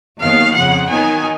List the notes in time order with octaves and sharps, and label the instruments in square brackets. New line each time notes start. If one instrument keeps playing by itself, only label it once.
[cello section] D#2 D#3 F#3 B3 [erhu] F5
[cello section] F2 C#3 F3 [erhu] F#5
[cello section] D#3 F#3 B3 D#4 [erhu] G#5